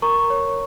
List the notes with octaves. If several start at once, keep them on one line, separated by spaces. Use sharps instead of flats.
A#4 A#5 C#6
C#5